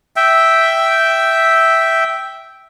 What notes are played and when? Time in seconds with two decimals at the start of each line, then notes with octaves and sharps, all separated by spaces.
0.16 E5 G5